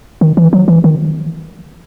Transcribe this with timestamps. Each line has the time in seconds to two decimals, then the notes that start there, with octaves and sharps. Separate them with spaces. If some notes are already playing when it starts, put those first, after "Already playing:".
0.21 D#3
0.37 E3
0.53 F#3
0.68 E3
0.84 D#3